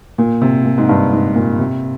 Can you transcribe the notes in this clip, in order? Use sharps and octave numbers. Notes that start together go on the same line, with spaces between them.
A#2
C3
A#2
G#2
G2
G#2
A#2
C3